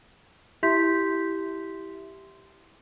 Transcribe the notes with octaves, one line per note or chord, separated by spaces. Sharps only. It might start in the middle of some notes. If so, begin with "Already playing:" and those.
E4 G4 E5 C6 G6 B6